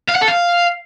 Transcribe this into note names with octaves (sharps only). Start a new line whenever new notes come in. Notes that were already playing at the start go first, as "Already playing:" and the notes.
F5
F#5
A4
F5